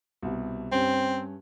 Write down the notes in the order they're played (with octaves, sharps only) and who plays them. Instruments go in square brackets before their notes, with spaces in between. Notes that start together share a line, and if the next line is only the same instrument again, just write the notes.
[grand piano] C2 B2
[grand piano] G2 C#4 [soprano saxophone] C4